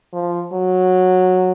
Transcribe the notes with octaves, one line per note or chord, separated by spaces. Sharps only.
F3
F#3